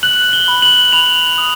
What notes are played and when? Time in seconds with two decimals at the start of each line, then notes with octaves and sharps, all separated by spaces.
0.03 F#6 F#7
0.33 G7
0.48 B5
0.62 F#7
0.93 B5 F7
1.38 D#6